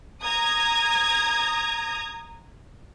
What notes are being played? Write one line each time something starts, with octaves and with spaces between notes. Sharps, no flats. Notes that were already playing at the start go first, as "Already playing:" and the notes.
A#5 D#6 G#6